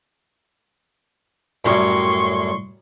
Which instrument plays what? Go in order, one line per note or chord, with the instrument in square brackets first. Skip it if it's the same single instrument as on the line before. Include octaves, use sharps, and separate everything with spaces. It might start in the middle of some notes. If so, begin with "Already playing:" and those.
[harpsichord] F#2 A2 G3 [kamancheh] C6 C#6